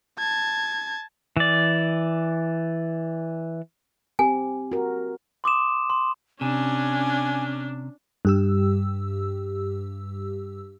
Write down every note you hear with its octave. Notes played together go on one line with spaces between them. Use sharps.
A5 G#6
E3 D5
C4 G4 G#5
F#4 A#4
C6 D6 D#6 E7
C6
C3 C#4 D4 G#5
G2 G4 E6